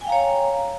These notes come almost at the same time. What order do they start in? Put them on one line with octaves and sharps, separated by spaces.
G#5 G5 F5 A#5 C#5